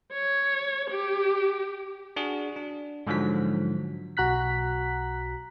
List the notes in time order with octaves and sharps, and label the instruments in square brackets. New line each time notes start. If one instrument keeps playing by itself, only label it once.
[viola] C#5
G4
[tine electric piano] D4 F#4 G#4
D4
G#2 D3 F3 F#3 B6
[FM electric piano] B1 F#4 A#5 F#6 B6